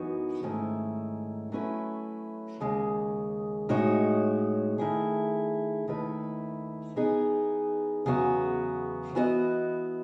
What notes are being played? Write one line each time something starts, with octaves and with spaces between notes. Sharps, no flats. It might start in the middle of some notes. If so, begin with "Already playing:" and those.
Already playing: F#2 E3 B3 D#4 F#4
G#2 D#3 A3 C#4 E4
F#3 A3 C#4 E4 B4
D#2 C#3 G#3
A2 G#3 D#4 F#4 C#5
D#3 A3 E4 G#4
D#2 D#3 A3 E4 B4
E3 B3 D#4 G#4
E2 C#3 F#3 B3 F#4
E3 B3 F#4 B4 D#5